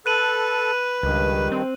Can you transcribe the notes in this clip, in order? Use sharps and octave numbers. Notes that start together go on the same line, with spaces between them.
A4 B4 F#6 D#7 F#7
C#2 G2 D#3
C4